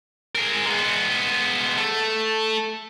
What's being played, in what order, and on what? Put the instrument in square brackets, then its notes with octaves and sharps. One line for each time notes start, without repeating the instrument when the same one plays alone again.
[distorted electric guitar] G#4 A#4
G#3 B3
A3